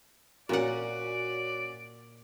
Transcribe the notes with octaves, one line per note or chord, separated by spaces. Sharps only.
A#2 C#4 F#4 D5 F#5